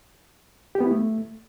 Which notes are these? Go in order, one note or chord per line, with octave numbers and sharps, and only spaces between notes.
G4
B3
E4
A3